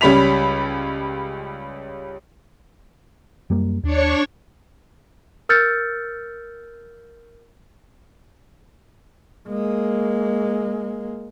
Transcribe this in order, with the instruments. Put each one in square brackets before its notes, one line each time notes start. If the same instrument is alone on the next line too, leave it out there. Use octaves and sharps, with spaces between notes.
[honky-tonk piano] C#2 G3 C#4 B5 B6 F7
[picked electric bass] F#2 G3 A#3
[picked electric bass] D#2 [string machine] D4 C#5 C#6
[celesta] A#4 E6 F6 G6 A6 C#7
[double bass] G#3 A#3